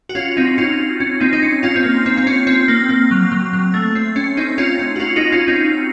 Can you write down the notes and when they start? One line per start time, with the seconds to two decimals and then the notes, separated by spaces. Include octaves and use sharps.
0.09 F#4
0.15 C#4 F4
0.37 C4 D#4
0.58 C#4 F4
1.00 C#4
1.20 C4 D#4
1.33 D#4
1.43 C#4
1.63 C#4 F4
1.76 C4
1.84 A#3
2.06 C4
2.17 C4
2.27 C#4
2.47 C4
2.68 A#3
2.89 A#3
3.11 F#3
3.32 F#3
3.53 F#3
3.74 A3
3.95 C4
4.16 C#4
4.37 C4 D#4
4.58 C#4 F4
4.79 C#4
4.96 F#4
5.00 C#4 F4
5.16 D#4 F#4
5.32 C#4 F4
5.48 C4 D#4